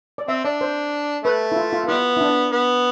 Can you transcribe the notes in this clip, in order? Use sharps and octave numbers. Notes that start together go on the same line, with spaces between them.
D5
C4 E5
D4 D5
C5
A3 B4
E4
F4
F4
F4
G3 B3 E4
E4
D4
B3